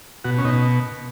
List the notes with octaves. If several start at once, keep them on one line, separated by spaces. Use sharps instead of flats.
B2 F#4
C#4
B2 D#4